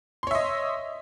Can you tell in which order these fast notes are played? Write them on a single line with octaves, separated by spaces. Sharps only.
C6 C#5 E5 D#5